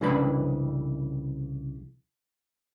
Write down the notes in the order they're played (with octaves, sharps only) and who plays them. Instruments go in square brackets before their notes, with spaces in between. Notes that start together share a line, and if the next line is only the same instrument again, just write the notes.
[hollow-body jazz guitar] C2 C#3 E3 D4 B4 B5